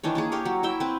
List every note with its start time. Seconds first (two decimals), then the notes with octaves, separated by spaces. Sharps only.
0.03 D#3 E3 D4 C#5
0.15 A#3 D4 G#4
0.32 G4 A#4 C#5
0.45 F#3
0.63 E4 E5 G5
0.80 C4 B4